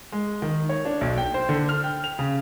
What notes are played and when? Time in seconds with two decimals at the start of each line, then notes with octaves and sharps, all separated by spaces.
0.12 G#3
0.42 D#3
0.69 C#5
0.85 D4
1.01 B1
1.18 G5
1.34 C5
1.49 D3
1.69 F6
1.84 G5
2.04 F7
2.19 C#3